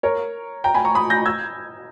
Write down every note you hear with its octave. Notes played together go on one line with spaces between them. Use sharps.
A#4 C#5
G5 A#5
G#5 B5
A#5 C#6
B5 D#6
G6 A#6
E6 G#6